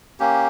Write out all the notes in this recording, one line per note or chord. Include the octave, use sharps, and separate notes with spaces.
A#3 C#4 G4